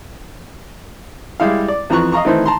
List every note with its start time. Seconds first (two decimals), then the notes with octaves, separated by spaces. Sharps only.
1.40 G3 G#3 E4 F5
1.68 D5
1.90 F2 E3 F3 A#5 C#6 F#6
2.12 D#5 F5 A#5 C#6
2.25 D#3 E3 A3 C4 D#4 E4
2.46 A5 A#5 C6